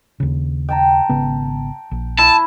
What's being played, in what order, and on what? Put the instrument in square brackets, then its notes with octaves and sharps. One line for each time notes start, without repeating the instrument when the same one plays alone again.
[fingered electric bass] D#2 C#3
[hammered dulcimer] G5 A5 A#5
[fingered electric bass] G#1 C#3 B3
A#1
[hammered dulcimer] E4 [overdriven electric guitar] A5